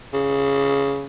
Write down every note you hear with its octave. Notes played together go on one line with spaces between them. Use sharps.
C#3